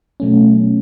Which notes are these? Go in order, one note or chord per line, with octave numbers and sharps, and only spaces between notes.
B2 F#3 A3 C#4